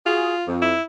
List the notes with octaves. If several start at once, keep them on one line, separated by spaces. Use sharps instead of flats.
F4 F#4 G#4
F2
E4